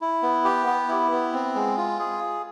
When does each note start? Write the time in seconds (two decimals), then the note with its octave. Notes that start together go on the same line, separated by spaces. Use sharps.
0.01 E4
0.23 B3
0.45 G4
0.66 B3
0.89 E4
1.11 B3
1.33 C4
1.55 G#3
1.77 F4
1.99 G#4